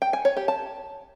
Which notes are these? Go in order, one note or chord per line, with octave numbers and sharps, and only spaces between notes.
G5
G#5
C#5
G4
A5